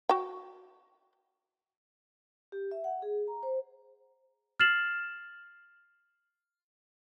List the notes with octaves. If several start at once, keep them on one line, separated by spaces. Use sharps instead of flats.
F#4 G5
G4
E5
F#5
G#4
A#5
C5
F6 A6 C7 E7 F#7